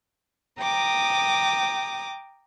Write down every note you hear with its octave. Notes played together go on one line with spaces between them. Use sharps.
G5 A#5 D6 D#6